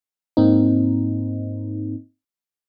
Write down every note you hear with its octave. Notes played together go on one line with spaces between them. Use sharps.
G#2 A#3 C4 D#4